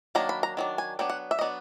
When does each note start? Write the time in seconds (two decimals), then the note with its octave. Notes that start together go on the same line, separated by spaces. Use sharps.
0.15 D#3 F#3 A#3 D4 A#5
0.29 B5
0.43 A#5
0.57 D#3 F#3 D4
0.78 G#5
0.99 F#3 B3 D4 G5
1.10 F#5
1.31 E5
1.39 F#3 B3 D4 D#5